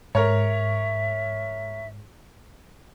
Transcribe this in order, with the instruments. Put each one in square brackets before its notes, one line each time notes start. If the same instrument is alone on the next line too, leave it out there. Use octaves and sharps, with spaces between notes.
[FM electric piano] G#2 [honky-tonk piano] A#4 C#5 [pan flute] E5